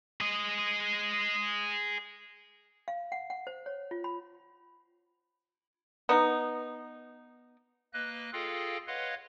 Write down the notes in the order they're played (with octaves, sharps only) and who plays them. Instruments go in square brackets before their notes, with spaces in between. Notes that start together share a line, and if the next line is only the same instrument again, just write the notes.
[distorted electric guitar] G#4 D#5
[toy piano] F5
F#5
F#5
C5
C#5
F4
B5
[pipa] B3 D#4
[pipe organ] A#3 B4 D#5 F#6
F4 G#4 A4 D#5 F5 G5
B4 C#5 D#5 F5 F#5 C6